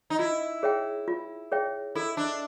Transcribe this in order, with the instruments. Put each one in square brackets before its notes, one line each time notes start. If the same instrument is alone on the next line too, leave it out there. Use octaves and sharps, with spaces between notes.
[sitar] D#4
[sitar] E4 [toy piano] F4
[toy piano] G#4 C#5 E5 G5
F4
G#4 C#5 E5 G5
[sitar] E4 [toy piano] A4
[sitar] D4